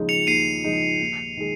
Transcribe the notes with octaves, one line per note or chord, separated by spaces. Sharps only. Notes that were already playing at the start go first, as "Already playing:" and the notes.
Already playing: D#2 C#3 F3 G#3 D#4
C#7 F7
D#2 C7 D#7
C#3 F3 G#3 D#4
D#2
D#3 G#3